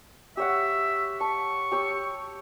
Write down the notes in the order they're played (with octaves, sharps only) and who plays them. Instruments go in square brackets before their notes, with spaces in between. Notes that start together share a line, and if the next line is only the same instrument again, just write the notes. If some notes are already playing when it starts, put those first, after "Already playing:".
[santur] G4 C#5 F#5 [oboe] E5
[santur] A5 [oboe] C#6
[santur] G4 C#5 E6